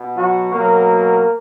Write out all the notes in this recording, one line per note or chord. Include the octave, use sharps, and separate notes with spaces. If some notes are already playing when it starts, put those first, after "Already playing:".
Already playing: B2
F#3 F#4
B2 F#3 A#3 A#4